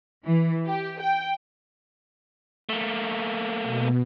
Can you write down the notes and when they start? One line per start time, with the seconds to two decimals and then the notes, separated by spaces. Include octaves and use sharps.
0.24 E3
0.66 G4
1.00 G5
2.69 A3 A#3
3.63 B2